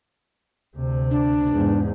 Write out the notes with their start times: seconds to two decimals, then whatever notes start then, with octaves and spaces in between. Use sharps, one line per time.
0.77 D2 C3
1.11 D4
1.51 E2 G#2